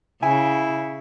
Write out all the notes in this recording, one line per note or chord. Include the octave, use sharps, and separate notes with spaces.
C#3 E4 G#5